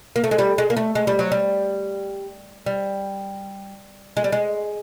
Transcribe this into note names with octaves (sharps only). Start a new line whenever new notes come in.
A#3
A3
G#3
G3
G#3
A#3
A3
G#3
G3
F#3
G3
G3
G#3
G3
G#3